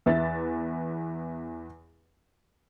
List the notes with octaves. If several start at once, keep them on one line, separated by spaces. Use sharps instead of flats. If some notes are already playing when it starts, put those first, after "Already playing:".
E2 B4 E5 A6